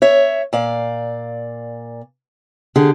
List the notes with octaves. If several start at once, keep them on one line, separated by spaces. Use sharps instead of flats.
C#5 E5
A#2 D5 F5
D3 G4 G#4